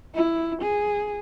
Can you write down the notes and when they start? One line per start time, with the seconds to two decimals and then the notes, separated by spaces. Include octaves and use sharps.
0.14 E4
0.62 G#4